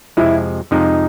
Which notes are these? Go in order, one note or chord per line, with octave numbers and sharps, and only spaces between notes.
F2 C3 F3 G#3 E4
F2 C3 F3 G#3 D#4